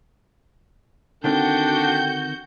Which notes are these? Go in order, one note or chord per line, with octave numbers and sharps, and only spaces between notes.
D3 D#3 C4 D4 F#4 A4 G5 G6